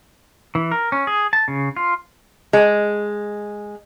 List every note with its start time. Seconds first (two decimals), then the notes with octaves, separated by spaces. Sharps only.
0.55 E3
0.72 A#4
0.92 C#4
1.07 G#4
1.33 A5
1.48 C#3
1.77 F4
2.53 G#3